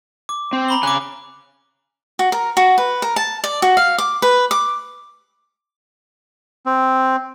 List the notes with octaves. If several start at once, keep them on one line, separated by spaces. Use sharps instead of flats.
D6
C4
A#5 B5 G7
C#3 G#5 D6 F#6
F#4
A#4
F#4
B4
A#4
A5
D5
F#4
F5
D6
B4
D6
C4